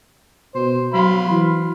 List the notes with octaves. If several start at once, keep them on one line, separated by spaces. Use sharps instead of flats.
B2 C5
F#3 F5 B5 C6
E3